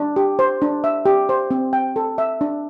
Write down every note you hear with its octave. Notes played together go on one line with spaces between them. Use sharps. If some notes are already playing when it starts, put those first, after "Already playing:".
Already playing: D4
G4
C5
D4
E5
G4
C5
C4
G5
A4
E5
D4